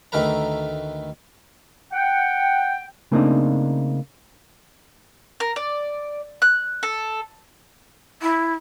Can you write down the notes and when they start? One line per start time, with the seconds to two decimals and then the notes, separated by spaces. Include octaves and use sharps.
0.12 D2 D#3 A3 A#4 B4 A#5
1.91 F#5 G5
3.12 C#3 A3 A#3 C4 D4 D#4
5.40 A#4
5.56 D5
6.42 F#6
6.83 A4
8.22 E4